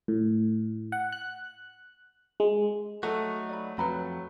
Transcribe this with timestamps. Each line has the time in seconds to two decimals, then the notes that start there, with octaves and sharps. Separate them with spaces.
0.08 A2
0.92 F#5
1.12 F#6
2.40 G#3
3.03 F#3 A3 D#4 F#4
3.49 D5 B5
3.78 F2 F#3 B4 A#5 B5